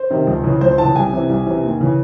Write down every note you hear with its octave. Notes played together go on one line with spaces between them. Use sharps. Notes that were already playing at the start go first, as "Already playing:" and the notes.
Already playing: C5
C3 D#3
C#2
C#3 E3
C#2 C5
C#3 E3 A5
C2 G#5
C3 E3
C2
C3 E3
D#2
C#3 E3